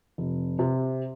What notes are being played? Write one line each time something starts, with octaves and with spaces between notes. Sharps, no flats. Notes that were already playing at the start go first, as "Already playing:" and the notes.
F1
C3